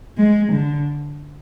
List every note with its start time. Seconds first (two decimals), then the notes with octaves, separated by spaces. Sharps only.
0.18 G#3
0.53 D3